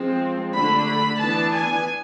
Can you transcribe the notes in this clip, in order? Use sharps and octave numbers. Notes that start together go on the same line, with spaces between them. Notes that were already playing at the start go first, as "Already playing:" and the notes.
Already playing: F3 G#3 C4
D3 A3 D4 B5
B5
E3 B3 D4 A5
G#5